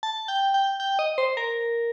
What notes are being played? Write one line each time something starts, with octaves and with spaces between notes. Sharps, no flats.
A5
G5
G5
G5
D#5
C5
A#4